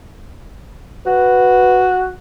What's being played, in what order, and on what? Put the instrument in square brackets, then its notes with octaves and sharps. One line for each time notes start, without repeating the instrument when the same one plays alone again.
[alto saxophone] F#4 [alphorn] B4